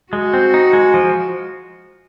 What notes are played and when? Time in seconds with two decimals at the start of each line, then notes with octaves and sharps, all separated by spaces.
0.13 G#3 F#4
0.34 C4
0.54 D#4
0.73 G#3
0.94 F3